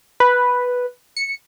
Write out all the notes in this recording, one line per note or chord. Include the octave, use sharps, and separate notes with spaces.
B4
C#7